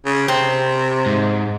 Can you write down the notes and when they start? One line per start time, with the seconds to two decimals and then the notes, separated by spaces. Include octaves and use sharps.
0.05 C#3
0.28 C3 C4
1.06 G#2